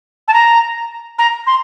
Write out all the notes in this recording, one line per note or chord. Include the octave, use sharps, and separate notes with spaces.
A5
A#5
A#5
C6